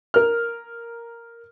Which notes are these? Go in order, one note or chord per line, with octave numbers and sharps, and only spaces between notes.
A#4 F6